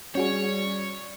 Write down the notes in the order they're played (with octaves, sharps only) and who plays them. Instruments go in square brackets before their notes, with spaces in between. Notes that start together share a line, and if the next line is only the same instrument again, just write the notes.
[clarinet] G3 [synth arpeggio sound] C#4 F#4 G#4 [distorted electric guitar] C#5